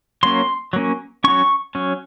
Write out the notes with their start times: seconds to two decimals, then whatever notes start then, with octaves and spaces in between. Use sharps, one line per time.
0.23 F#3 A#3 C#4 C6
0.73 F#3 A#3 C#4
1.24 F#3 C#4 C#6
1.75 F#3 C#4